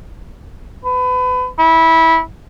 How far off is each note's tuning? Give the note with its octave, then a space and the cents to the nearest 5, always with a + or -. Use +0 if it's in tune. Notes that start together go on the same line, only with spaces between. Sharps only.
B4 +30
E4 -20